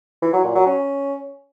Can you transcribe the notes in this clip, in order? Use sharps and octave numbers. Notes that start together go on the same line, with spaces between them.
E3
F#3
A#2
F#3
C#4